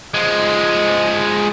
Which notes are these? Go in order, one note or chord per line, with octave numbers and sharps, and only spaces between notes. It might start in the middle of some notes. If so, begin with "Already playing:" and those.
F3 G#3